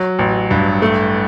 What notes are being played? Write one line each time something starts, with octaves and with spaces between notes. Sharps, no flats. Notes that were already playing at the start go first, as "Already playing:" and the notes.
Already playing: F#3
A1
G2
A3